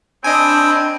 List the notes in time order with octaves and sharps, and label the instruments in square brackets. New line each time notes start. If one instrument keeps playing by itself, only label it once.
[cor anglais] C4 [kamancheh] D4 B5 [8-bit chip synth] D#5 G#5 [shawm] G5